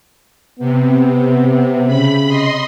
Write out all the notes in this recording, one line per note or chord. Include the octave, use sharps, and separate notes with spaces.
C3 B3
C#3 B5
D#5 C6